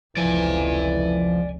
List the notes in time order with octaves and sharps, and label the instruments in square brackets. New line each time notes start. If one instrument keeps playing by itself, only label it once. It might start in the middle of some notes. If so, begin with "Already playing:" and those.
[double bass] F1 C#2 [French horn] E3 [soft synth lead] F3 [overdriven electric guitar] D5 G#5